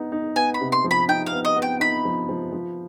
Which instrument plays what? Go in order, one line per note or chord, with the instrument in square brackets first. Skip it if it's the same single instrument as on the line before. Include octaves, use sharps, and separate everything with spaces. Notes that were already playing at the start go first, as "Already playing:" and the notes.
Already playing: [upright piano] B3 D#4
D#4
[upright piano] B3 [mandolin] G#5
[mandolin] B5
[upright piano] C3
[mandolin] C6
[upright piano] F3
[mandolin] B5
[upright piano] D#4 [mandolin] G5
[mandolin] F5
[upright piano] B3
[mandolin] D#5
[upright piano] B3
[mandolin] G5
[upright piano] D#4 [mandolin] B5
[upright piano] F3
F3
F3